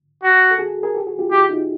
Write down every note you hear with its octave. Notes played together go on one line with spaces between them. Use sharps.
F#4
A4
F#4 G#4
G#4 A#4
G4 A4
F#4 G#4
F4 G4
E4 F#4 G4
D#4 F4